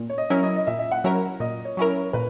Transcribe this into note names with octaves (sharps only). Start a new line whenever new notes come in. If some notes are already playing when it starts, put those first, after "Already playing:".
Already playing: A#2
C#5
D#5
F#3 C#4 E4 A#4
D#5
D#5
A#2 E5
E5
F#5
F#3 C#4 E4 A#4
A#2 D#5
C#5
F#3 C#4 E4 A#4
C#5
A#2 B4